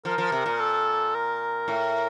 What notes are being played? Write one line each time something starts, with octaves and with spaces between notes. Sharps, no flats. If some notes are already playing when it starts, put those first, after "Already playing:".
F3 A#4
F3
C3
A#2
A4
A#4
A2